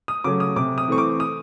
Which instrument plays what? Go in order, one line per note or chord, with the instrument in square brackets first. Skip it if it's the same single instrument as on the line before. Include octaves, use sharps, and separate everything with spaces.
[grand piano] D#6
C#3 F#3 A3 C#4 D6
D#6
C3 D6
D#6
E3 A3 C4 C#6
D6
D#6